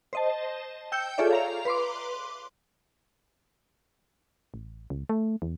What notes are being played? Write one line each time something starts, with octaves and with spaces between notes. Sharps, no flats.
C5 D#5 A5
G5 E6 G6 C#7
F4 G#4 A4 C#5 D5 E5
F5 A#5 F7
B4 C6 D6
A1
C#2
A3
E2